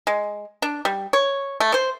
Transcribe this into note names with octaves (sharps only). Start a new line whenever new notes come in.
G#3
D4
G3
C#5
A3
C5